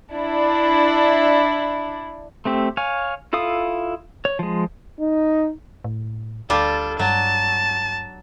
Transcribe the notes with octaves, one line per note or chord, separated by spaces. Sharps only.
D4 E4
A3 C4 G4
C#5 F5 G#5
E4 F4 A4 F5 D#6
C#5
F3 G#3
D#4
A2
D2 G3 D4 F4 A4
G2 F#3 A5